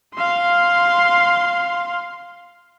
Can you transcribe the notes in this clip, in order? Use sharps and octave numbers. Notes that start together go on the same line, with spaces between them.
F5 C6